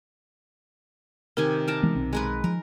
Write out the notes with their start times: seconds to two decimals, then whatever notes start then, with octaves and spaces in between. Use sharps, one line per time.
1.37 C3 D#3 A#4 G#5
1.68 A#4 A5 A#5 F6 D7 E7
1.83 E3 G#3 B3
1.95 B1 C4
2.13 G#3 A#4 B4
2.44 F3 A#4